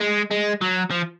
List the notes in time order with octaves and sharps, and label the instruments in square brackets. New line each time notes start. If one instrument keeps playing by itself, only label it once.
[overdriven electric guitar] G#3
G#3
F#3
F3